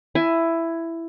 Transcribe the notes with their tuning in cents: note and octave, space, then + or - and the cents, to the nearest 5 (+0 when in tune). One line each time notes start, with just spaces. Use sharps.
E4 +10 G#5 +0